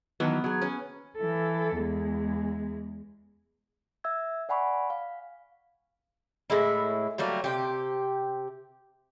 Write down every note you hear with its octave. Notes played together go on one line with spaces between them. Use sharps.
D#3 E3 F#3 B3
F#3 G#4
C#4
E3 A4
E2 G#3
E5 E6 G#6
D5 F#5 G#5 B5 C#6 D6
F5
A2 G#3 E4
F#3 G3 A3 A#3
C3 G4